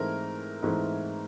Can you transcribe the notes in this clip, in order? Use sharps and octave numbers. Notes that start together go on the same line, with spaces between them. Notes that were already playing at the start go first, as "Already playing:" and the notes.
Already playing: G#2 E3 A3 C4 A#4
G#2 E3 A3 C4